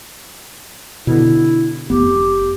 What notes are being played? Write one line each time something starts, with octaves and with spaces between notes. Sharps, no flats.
B2 D3 E4
F1 B3 G4